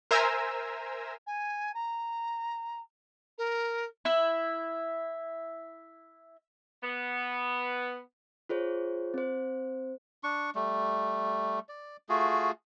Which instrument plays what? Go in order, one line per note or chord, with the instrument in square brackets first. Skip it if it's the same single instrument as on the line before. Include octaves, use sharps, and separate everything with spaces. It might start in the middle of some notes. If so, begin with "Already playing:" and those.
[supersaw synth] A#4 C5 E5 G#5 A#5 E6
[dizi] G#5
A#5
A#4
[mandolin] E4 E5
[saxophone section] B3
[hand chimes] F4 G#4 C5 C#5
C4 C5
[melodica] D4 C#6
G3 A3
D5
A3 F4 F#4 G#4